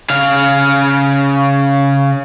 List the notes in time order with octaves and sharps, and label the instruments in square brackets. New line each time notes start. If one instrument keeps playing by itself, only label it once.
[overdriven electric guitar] C#3 F5